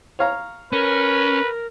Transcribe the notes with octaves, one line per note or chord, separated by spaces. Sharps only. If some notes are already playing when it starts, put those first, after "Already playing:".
C#5 F5 A#5
C#4 A#4 B4